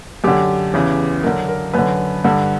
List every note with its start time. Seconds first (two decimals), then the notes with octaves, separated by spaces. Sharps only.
0.24 F#2 D3 G4
0.74 E2 C#3 E3
1.23 F#2 D3 A#4
1.49 A#4
1.74 F#2 D3 B4
2.24 G2 D3